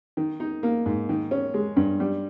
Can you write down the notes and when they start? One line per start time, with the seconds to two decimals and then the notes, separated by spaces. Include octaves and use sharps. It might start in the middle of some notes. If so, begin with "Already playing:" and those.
0.17 D#3
0.40 D#4
0.63 A#3
0.86 G#2
1.09 D#3
1.31 C#4
1.54 G#3
1.76 G2
2.00 G3